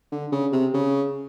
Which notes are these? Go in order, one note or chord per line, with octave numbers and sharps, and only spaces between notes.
D3
C#3
C3
C#3